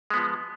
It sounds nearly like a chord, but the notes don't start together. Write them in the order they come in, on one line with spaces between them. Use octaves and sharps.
G#3 B3 F3